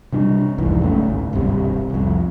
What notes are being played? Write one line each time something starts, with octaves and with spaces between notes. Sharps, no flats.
C3 G3 D4
C2 F2 G#2 E3
F#1 A3 C#4
G#1 C#2
D1 G#1 G2 C3
C2 F2